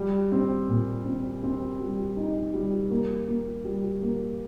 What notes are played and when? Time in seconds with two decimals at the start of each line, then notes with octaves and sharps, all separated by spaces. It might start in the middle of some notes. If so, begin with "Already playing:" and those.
Already playing: G3
0.32 C4
0.68 A#2
1.05 C4
1.43 C4
1.80 G3
2.16 D#4
2.54 G3
2.90 A#3
3.28 A#3
3.65 G3
4.02 A#3